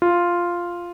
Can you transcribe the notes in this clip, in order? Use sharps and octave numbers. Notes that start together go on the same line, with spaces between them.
F4